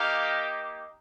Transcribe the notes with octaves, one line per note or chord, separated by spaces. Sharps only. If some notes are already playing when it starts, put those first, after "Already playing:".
Already playing: A#3 D#4 G4 F5